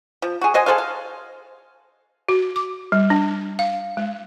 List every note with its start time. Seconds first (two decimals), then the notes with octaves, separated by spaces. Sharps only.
0.22 F3
0.41 F#4 G#4
0.54 F#4 C5 D#5 G#5
0.66 G#4 A4 C5 F5
0.78 F5
2.29 F#4
2.56 D6
2.92 G3
3.10 D4
3.59 F5
3.97 G#3